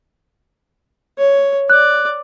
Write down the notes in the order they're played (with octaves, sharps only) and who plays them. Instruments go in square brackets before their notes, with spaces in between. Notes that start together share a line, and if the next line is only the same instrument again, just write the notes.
[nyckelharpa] C#5
[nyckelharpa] D5 [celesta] F#6